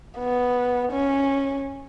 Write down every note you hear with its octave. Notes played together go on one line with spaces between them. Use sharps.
B3
C#4